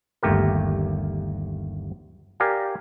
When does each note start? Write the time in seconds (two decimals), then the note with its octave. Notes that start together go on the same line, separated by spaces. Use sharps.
0.23 G1 D#2 A3 G4 A#4
2.40 G4 A#4 D5 F5 G#5